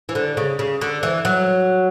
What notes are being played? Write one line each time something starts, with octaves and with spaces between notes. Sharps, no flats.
E3
D3
C#3
C#3
D3
E3
F#3